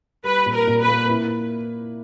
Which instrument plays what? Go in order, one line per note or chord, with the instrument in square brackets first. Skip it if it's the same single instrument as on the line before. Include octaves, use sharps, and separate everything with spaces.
[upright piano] G3 [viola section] B4
[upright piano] A#2
[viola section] A#4
[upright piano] A#2
[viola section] B4
[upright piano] A#3
E4